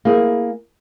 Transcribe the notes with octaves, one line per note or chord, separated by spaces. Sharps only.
A#3 E4 G#4